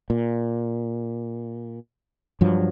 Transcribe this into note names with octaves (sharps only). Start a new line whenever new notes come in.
A#2
G2 F3 F#3